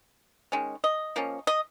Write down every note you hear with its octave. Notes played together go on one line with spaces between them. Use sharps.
D#3 G#3 C#4
D#5
F3 A#3 C#4
D#5